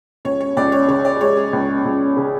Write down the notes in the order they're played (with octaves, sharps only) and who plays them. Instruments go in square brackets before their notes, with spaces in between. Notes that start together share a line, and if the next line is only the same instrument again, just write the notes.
[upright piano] C#2 [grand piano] C#5
[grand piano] C#5
[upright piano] C#2 [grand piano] D5
[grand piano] C#5
[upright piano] C#3 [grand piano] C#5
[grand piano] D5
[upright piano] G#3 [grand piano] C#5
[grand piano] G#4
[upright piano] C#2
C#2
C#3